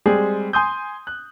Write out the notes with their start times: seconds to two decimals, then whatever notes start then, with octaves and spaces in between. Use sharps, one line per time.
0.06 G3 G#3 C4 G#4
0.53 G#5 C6 D#6 G6
1.07 F#6